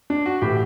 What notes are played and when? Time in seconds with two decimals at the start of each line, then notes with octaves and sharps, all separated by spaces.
0.10 D4
0.26 F#4
0.41 A2 E3 G4